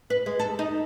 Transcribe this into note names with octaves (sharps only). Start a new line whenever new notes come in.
B4
G#3
A4
D#4